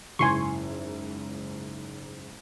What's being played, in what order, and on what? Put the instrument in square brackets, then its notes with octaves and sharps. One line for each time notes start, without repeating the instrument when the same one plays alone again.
[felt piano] F#1 G#2 E4 [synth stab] G#5 C6 C#6